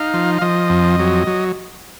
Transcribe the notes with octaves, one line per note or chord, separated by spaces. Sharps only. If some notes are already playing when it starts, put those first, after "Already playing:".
Already playing: D#4 F5
F3
F5
F3 D#5
F2
F#3
F#3